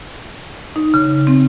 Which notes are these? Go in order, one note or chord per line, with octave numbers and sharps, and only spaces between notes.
D#4
C#3
C4